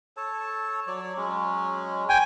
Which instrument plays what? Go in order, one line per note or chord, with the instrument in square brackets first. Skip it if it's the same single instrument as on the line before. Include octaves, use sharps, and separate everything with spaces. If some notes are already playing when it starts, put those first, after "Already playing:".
[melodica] A4 C#5 A5
F#3 C#5 D5
F#3 G#3 C#4
[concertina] G5 G#5